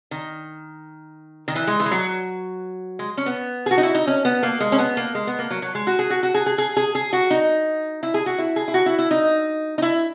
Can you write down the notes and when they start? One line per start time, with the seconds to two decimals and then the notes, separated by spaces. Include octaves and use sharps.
0.11 D#3
1.48 D#3
1.56 E3
1.67 G#3
1.80 E3
1.86 G#3
1.91 F#3
2.99 G#3
3.17 C#4
3.26 B3
3.66 G#4
3.71 F#4
3.78 D#4
3.83 E4
3.95 D#4
4.07 C#4
4.25 B3
4.43 A#3
4.60 G#3
4.72 C#4
4.79 B3
4.97 A#3
5.15 G#3
5.27 B3
5.39 A#3
5.50 F#3
5.62 F#3
5.75 G#3
5.87 F#4
5.99 G#4
6.10 F#4
6.23 F#4
6.34 G#4
6.46 G#4
6.58 G#4
6.77 G#4
6.95 G#4
7.13 F#4
7.30 D#4
8.03 E4
8.14 G#4
8.26 F#4
8.38 E4
8.56 G#4
8.68 E4
8.74 F#4
8.86 E4
8.99 E4
9.11 D#4
9.78 D#4
9.82 E4